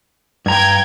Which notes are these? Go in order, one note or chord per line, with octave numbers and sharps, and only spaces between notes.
G2 G5 A#5 G#6